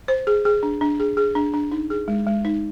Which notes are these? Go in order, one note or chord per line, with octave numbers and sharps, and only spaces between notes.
C5
G#4
G#4
D4
D4
G#4
G#4
D4
D4
D#4
G#4
G#3
G#3
D#4